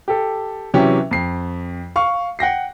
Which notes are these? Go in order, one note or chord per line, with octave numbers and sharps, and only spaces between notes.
G4 A4
C3 E3 F#3 C#4 G4
F2 C7
F5 C#6
F#5 G5 A#6 C7